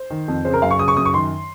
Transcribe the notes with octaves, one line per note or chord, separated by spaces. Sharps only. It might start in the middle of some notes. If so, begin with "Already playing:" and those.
Already playing: C5
D#3
F2
C#3 C5
A#4
F#2 F5
C#6
C#3 D#6
C#6
F#2 D#6
C#6
D#3 C6